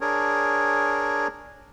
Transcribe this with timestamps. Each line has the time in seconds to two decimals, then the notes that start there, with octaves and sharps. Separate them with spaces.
0.01 D4 G#4 A#4 C#5